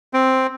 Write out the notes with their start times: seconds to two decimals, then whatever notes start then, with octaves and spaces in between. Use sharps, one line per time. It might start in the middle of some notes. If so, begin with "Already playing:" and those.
0.13 C4